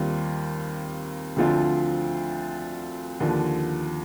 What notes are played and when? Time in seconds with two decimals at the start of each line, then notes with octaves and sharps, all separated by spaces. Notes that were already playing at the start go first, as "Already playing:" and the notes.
Already playing: D#2 D#3 G3 C4 F4
1.36 D2 D3 F3 C4 F4
3.20 D#2 D3 F3